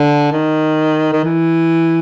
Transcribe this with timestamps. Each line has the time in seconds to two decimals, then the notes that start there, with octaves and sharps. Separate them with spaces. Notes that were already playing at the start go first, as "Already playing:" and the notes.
Already playing: D3
0.32 D#3
1.13 D#3
1.24 E3